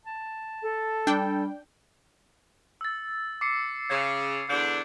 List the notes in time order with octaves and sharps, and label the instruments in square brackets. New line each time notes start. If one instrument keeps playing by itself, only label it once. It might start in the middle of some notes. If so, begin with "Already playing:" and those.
[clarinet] A5
[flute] A4
[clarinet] G3 [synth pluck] D4 G5
[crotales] E6 A6
D6 C7 C#7
[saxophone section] C#3 [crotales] G#6
[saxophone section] E2 D3 D4 [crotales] G6